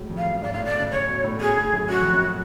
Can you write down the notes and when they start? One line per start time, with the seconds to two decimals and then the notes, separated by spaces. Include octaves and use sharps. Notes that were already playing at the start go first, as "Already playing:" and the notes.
Already playing: A2 F#3 G#3
0.09 F2
0.17 F5
0.26 F#2
0.42 G#2 D5
0.52 A2 F5
0.64 B2 D5
0.79 C#3
0.91 C#3 C#5
1.07 B2
1.24 A2
1.40 B2 G#4
1.57 A2
1.73 F#2
1.89 F#2 F#4
2.01 F2
2.13 F#2